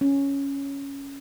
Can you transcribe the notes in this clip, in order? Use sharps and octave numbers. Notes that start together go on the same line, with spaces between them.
C#4